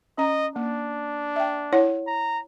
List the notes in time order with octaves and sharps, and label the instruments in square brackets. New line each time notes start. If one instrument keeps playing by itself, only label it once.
[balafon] C#4 A#5 [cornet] D#5
[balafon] A#3 [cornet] D4
[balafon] E5 G5
E4 C#5 F#5
[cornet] A#5